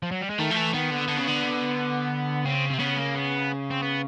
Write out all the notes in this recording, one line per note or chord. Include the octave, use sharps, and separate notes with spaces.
F3
F#3
G3
G#3
D#3 A3
F3
E3
D#3 B3
D3
D3
C#3
D3
C#3 C4
C3 C4
C#3 B3
A#3
B3
C4
B3